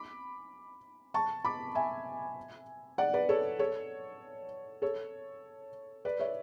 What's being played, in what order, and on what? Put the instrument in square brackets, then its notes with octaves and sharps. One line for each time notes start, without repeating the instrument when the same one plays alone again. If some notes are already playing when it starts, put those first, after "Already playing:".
Already playing: [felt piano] B5 D6
A5 C#6
B5 D6
E5 G#5
D5 F#5
B4 D5
A4 C#5
A4 C#5
A4 C#5
B4 D5
C#5 E5